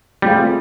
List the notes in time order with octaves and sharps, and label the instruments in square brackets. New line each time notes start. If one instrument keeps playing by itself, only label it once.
[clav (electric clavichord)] G3 [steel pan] A3 C4 F4 G#4